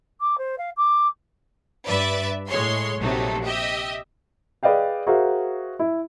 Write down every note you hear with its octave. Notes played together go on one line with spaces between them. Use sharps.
D6
C5
F5
D6
G2 B4 D5 E5 A6
A2 G#3 C#5 C6
A#1 C3 F#3 A3 D#4
G4 D#5 E5
G#4 B4 D5 D#5 F5 G5
F#4 G#4 A#4 C5 E5 F5
E4